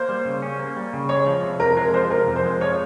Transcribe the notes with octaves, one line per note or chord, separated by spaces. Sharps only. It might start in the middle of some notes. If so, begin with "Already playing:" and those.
Already playing: A#3 C5
G3
C#3
C#4
A#3
G3
C#3
G#3 C#5
F3
C3
F2 A#4
G#3 A#4
F3 C5
C3 A#4
F2
C5
G#3
F3 C#5